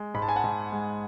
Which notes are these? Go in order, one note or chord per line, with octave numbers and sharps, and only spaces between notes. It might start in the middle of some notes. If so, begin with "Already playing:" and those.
Already playing: G#3
G#2 B5
A5
G#5
F#5 A5
G#2
G#3